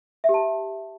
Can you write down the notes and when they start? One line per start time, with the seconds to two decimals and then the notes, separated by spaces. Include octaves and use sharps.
0.24 E5
0.29 G4
0.34 A5